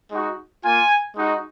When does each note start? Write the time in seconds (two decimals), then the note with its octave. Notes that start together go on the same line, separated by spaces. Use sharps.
0.12 G#3 D#4 F#4
0.64 A#3 F4 G#5
1.16 G#3 D#4 F#4